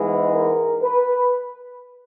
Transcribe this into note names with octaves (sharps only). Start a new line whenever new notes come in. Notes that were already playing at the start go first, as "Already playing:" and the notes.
Already playing: G#2 E3 G#3 B3 E4
A#4
B4